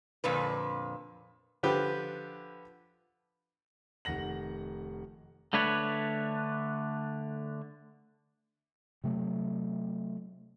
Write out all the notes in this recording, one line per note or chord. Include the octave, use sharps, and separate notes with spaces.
F2 A#2 D3 B4
D3 F3 G4 B4
F1 D#3 F#5 A#6 F#7
D3 A3 D4 B4 C#5
C3 F#3 A3